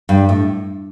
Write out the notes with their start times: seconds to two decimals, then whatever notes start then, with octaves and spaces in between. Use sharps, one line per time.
0.09 G2
0.29 A2